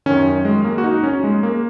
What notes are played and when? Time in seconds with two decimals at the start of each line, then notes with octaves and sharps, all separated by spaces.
0.06 F#2 D#3 C#4
0.45 G#3
0.64 A#3
0.78 F#4
0.84 D#4
1.04 C#4
1.24 G#3
1.43 A#3